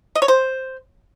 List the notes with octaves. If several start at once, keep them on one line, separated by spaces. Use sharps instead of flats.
D#5
C#5
C5